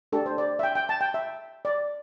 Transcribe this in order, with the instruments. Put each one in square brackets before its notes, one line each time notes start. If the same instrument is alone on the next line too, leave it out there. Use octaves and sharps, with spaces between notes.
[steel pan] A3 D4 G4 A4
C5
D5
E5
G5
G5
A5
G5
E5
D5